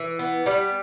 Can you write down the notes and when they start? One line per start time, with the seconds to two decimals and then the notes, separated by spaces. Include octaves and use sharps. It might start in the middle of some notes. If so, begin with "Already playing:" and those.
Already playing: E3
0.19 B3
0.46 G3